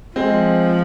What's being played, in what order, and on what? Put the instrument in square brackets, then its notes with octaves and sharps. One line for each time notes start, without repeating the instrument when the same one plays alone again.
[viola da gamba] F3 [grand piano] G#3 C4